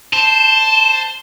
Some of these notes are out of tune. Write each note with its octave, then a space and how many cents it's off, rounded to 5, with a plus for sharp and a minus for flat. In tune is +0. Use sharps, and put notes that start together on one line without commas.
C5 +0 A5 +0